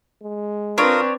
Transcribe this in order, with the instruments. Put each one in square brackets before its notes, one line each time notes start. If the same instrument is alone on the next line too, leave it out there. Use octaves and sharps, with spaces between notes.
[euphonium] G#3
[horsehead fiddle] C4 B4 [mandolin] D4 C#5 [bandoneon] F4 A#4 D#6